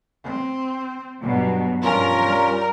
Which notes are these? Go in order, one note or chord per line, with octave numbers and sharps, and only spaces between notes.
C4
G2 B2 F#3
G2 F3 C#4 F4 A#4
G3